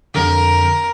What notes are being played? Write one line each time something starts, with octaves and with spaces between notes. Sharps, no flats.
F2 D3 A#4